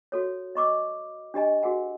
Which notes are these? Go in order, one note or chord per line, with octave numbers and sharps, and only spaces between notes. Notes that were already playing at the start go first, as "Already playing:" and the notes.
F#4 A4 C#5
D#5 C#6 D6 E6
D4 G4 D#5 G#5
F#4 G#4 A#4 F#5 G#5